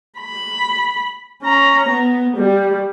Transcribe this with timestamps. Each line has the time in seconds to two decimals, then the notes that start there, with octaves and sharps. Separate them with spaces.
0.19 B5
1.44 C#4 A#5
1.89 B3
2.38 G3